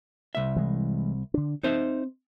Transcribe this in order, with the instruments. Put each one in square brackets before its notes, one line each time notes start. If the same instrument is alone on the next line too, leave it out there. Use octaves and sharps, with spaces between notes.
[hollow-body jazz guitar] C2 E5
[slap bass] E3 G#3
D3 D4
[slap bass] C4 [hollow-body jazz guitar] D#4 C5 E5